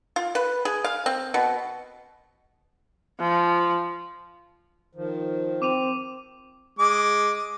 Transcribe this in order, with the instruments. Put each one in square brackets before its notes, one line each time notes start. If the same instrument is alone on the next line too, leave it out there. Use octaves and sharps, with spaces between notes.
[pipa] F4
B4
G#4
F5
C4
B2
[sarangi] F3
[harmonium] D#3 F3
[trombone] C4 [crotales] D6 D#7 F7
[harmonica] G#3 D6